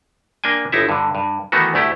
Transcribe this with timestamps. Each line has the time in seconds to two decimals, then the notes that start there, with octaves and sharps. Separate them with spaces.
0.44 A#3 D4 G5 G#5
0.72 G1 D#4 E4 E5
0.89 G2 D3
1.15 G2
1.52 D#3 E3 A3 B3 D#4 F#4
1.74 D2 A3 E4 G4